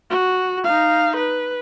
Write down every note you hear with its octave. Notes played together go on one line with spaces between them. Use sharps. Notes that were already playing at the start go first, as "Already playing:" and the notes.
F#4
D#4 F5
B4